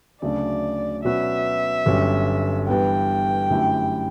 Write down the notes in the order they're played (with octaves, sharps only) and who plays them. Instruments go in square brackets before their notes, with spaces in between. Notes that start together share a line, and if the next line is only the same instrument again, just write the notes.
[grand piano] D2 C#3 F#3 A3 D4 [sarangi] D5
[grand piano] B2 F#3 C#4 F#4 B4 [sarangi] E5
[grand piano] G1 G2 F#3 C#4 G4
[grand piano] G2 E3 B3 [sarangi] G5
[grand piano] F#2 D3 A3 E4 G4